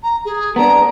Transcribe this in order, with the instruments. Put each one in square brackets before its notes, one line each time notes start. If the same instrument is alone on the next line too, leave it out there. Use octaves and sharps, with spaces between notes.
[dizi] A#5
G#4
[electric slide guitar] B3 D4 [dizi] A#5